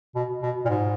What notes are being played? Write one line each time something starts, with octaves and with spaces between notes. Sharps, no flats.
B2
B2
A#2
G#2